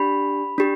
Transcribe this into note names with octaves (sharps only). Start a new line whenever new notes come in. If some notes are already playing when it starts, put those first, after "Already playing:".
Already playing: D4 G4 B5
D4 G4